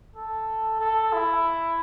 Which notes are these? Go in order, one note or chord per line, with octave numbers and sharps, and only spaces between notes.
A4
A4
E4